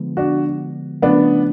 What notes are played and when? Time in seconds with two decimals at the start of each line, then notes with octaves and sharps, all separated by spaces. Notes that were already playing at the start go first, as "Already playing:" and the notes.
Already playing: D3 F3 G#3 B3
0.17 D4 F#4
1.02 C#3 F3 A3 B3 C#4 D4